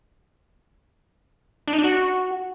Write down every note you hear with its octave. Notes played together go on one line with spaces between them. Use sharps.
D4
D#4
D4
F#4